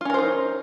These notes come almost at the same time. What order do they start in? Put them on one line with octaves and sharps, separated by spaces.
F4 C#4 A#4 C5 D#4